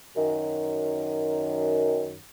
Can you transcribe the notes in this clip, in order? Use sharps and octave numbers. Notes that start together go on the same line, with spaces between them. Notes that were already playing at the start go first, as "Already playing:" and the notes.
F#2 D#3